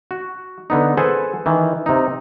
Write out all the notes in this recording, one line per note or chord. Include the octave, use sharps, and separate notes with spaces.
F#4
D3 B3 D#4
G#4 A4 B4 C5 F#5 G#5
D#3 E3
C3 D#4